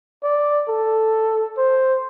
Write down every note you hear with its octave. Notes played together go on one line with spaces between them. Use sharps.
D5
A4
C5